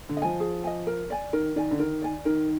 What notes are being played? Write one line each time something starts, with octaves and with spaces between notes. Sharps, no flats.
D3
D#5
F3 G#5
G#4
D#5 G#5
A#4
D5 G#5
D#3 A#4
D#3 D5 G#5
D3
D#3 A#4
D5 G#5
D#3 A#4